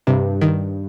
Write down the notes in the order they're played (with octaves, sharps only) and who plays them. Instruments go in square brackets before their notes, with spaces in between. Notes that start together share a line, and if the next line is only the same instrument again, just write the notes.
[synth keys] G2 [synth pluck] C3
[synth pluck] D#3